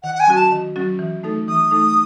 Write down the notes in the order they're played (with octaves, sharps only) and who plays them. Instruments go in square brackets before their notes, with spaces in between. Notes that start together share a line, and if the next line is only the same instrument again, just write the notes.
[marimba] D#3 [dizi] F#5
[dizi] F#5
G#5
[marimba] F#3 C#4 F#4
[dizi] A5
[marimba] D#3
F#3 C#4 F#4
E3
A3 D#4 A4
[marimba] E3 [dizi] D#6
[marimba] A3 D#4 A4